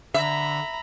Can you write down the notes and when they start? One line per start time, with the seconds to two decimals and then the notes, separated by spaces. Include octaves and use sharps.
0.14 D3 E5 A#5 B5